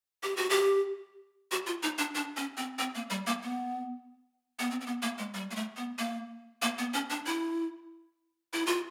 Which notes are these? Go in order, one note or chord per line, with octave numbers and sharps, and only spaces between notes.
G4
F#4
G4
F#4
F4
D#4
D4
D4
C#4
C4
C4
A#3
G3
A#3
B3
B3
C4
C4
B3
A#3
G#3
G3
A#3
A3
B3
A#3
A#3
B3
C#4
D4
E4
E4
F4